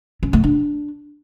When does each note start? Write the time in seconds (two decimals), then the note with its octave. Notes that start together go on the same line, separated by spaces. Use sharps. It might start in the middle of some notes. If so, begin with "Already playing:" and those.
0.23 C#4
0.33 A3
0.44 D4